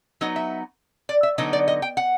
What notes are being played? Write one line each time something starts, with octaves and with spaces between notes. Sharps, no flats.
F#3 B3 D#4 D#5
E5
D5
E5
D3 F#3 B3 D#4 D#5
D5
D#5
G5
F#5